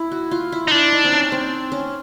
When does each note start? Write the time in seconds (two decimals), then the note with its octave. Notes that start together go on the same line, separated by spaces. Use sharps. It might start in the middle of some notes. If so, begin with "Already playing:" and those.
Already playing: E4
0.12 F#4
0.31 F4
0.52 E4
0.68 D#4
0.71 D4 E4
0.92 D#4
1.05 C4
1.12 C#4
1.32 C4
1.72 C#4